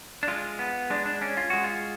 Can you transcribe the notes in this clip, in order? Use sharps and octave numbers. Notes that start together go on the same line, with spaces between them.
D4
G#3 F4
B3
G#3 D4
D4
C#4 D4
F4
G#3 F#4
F4